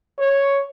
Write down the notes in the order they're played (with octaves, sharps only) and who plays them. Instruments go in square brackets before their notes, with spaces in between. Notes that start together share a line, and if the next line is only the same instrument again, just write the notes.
[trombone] C#5